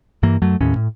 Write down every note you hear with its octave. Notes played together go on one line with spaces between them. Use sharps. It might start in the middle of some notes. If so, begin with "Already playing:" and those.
G2 E3 A#3
F#2 F#3 A3
D#2 A2 C#4
A2